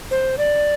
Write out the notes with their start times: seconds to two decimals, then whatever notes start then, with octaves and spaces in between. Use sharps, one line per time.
0.11 C5
0.38 D5